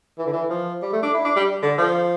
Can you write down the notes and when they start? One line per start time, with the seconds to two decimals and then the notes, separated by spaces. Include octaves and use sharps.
0.19 E3
0.26 D3
0.33 E3
0.50 F3
0.82 G3
0.93 A3
1.03 D4
1.14 E4
1.25 D4
1.36 G3
1.63 D3
1.78 F3